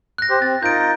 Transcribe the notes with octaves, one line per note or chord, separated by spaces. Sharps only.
F#6 A#6
G4 C5
C4 A6
D#4 F4 A#4 G6 D7